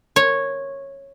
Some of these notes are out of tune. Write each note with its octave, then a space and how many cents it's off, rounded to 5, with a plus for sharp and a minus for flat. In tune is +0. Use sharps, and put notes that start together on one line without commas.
C#5 -10